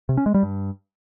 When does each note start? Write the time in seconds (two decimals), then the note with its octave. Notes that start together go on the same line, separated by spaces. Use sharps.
0.09 C3
0.17 C#4
0.26 G#3
0.34 G3
0.43 G2